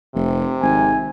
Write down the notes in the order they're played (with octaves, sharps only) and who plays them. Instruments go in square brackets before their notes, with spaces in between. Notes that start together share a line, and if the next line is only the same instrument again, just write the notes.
[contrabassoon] F1 [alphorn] C3
[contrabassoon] G#1 [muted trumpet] G#5